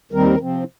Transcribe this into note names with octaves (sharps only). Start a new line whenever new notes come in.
D#2 D#3 G3 C4 A#4
C3 F3 C4